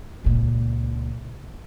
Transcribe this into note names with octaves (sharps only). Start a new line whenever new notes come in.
C#2 A#2